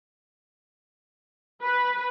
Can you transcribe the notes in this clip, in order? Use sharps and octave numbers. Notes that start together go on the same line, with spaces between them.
B4